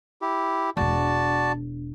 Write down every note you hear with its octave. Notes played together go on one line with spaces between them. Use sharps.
E4 G4
E1 D4 F#4 D5 A5